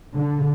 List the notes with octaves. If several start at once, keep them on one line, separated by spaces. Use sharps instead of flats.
D3